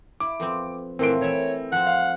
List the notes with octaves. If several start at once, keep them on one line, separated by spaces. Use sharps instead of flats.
E4 D6
F2 B3 C4
A#2 E3 A3 C4 C6 D7
E3 E4 C#5 E5
F3 C4 F#5
F5